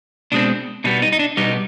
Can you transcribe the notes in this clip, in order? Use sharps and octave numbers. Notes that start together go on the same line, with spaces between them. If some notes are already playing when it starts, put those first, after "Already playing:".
B2 G#3 C4 D4
B2 G3 B3 D#4
D#4
D#4
D4
B2 G3 B3 D#4